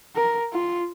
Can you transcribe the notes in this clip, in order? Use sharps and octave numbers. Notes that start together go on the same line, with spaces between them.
A#4
F4